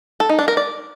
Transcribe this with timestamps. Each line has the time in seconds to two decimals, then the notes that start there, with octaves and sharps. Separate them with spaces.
0.20 A4
0.29 D#4
0.39 D4
0.48 A#4
0.57 D5